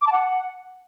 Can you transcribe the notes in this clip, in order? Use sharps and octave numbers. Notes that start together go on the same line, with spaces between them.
D6
A5
F#5